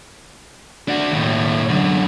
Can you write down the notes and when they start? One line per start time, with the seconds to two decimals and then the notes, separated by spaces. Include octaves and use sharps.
0.88 D4 F#4
1.12 D#2 A2
1.69 F#2 D3